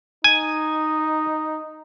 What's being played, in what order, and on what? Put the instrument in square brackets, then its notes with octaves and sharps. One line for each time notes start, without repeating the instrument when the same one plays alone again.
[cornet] D#4 [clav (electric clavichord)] G#5